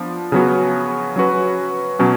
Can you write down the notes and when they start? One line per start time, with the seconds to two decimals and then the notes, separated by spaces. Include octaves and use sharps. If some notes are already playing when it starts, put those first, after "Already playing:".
Already playing: F3 B3 D4
0.32 C#3 F#3 B3 F#4
1.16 F#3 C#4 F#4 B4
1.99 B2 F#3 C#4